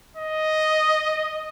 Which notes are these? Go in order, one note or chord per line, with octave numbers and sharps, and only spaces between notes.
D#5